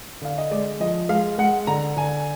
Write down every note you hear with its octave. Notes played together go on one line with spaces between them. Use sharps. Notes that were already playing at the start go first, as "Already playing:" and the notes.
D3 F5
D#5
G#3 D5
F3 D#5
G#3 F5
G#3 F#5
D3 A#5
D3 G#5